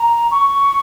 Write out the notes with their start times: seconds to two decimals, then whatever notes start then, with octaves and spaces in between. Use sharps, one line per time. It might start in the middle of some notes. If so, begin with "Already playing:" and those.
Already playing: A#5
0.31 C#6